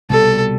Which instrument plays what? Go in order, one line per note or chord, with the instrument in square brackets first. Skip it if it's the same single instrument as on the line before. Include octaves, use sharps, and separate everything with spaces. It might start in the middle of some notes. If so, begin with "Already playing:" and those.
[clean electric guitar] C2 B2 G3 [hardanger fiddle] A4